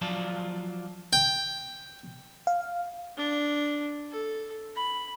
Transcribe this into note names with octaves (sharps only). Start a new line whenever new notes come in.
F3 F#3 F4 D5 A5
G5
F5
D4
A4
B5